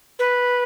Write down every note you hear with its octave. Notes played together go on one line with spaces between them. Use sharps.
B4